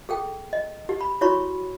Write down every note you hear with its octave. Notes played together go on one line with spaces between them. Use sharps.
G#4 A4 G5
D#5
G4
B5
E4 F#4 C#5 B5 C#6